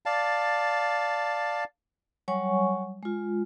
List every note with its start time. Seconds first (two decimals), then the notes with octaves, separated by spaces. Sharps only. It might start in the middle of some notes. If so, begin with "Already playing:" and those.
0.06 D5 F5 A5
2.28 F#3 G3 C#5 F#5 G#5 C#6
3.03 G#3 F4